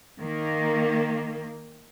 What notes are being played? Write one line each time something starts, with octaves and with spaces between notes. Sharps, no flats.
D#3 A#3